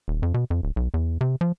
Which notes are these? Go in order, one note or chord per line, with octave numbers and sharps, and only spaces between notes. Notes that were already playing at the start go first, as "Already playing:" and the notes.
D#1
F2
B2
F2
D1
B1
E2
C3
F3